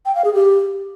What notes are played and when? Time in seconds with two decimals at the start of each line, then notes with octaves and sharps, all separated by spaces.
0.06 G5
0.15 F5
0.25 G#4
0.34 G4